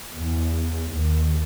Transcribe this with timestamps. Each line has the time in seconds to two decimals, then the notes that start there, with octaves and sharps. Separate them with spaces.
0.12 E2
0.89 D#2